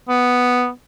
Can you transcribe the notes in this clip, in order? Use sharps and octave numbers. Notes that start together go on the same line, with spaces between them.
B3